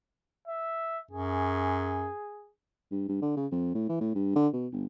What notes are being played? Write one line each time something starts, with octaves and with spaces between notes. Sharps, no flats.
E5
F#2 G#4
G2
G2
D3
C#3
F2
A2
E3
A2
G2
D3
B2
G1